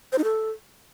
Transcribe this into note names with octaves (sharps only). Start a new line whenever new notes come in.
C5
D#4
A4